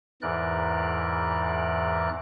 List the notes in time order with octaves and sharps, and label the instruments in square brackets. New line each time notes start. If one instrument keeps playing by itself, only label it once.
[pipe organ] E2 G#2 E3 A#4 D5 F#6